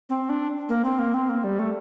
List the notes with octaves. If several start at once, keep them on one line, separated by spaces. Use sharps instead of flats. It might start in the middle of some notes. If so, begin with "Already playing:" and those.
C4
D4
A#3
C4
A#3
C4
A#3
G3
A3